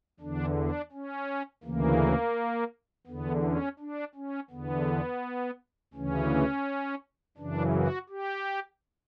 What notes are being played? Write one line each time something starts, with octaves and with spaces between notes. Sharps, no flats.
E2 D3 D4
D4
C#4
D2 C#3 E3 A#3
E2 D3 B3
C#4
D4
C#4
E2 D3 B3
D2 C#3 E3 C#4
F#2 C#3 E3 D4
F#4
G4